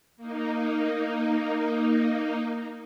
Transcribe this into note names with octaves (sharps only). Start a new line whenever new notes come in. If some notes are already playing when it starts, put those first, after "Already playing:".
A#3 D#4